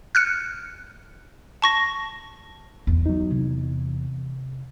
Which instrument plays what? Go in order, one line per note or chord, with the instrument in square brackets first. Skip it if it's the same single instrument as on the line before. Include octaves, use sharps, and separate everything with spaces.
[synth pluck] F6 F#6 C#7
[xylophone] A5 C#6 A#6
[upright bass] E2
[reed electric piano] F#3 D#4
C3